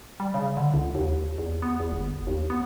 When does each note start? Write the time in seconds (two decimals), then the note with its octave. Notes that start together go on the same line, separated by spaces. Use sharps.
0.20 G3
0.34 C#3
0.57 D3
0.74 C#2
0.95 D#2
1.38 E2
1.62 B3
1.80 E2
1.92 G1
2.27 D#2
2.50 B3